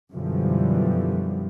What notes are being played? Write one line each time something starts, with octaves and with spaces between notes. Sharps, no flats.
F#2 B2 D3 E3 F3 G3